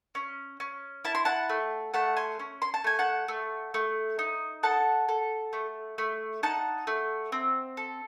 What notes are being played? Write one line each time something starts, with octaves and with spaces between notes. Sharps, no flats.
C#4
C#4
E4 A5
C6
F#5 A5
A3
A3 F#5 A5
G#5 C6
C#4
C6
A5
A3 G#5
F#5 A5
A3
A3
D#4
A4 F#5 A5
A4
A3
A3
D#4 F#5 A5
A3
C4
A4